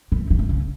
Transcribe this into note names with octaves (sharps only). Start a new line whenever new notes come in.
E3
E3
D#3
C#3